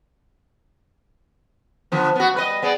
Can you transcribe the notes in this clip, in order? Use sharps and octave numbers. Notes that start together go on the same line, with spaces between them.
D3 F3 B3
B3 F#4
G3 B4 D#5
B3 G#4 D5